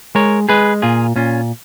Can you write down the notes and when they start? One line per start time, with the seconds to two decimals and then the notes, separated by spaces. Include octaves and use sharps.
0.15 G#3 A#4 C#5
0.49 G#3 G#4 B4
0.82 A#2 F4 G#4
1.16 A#2 C#4 F4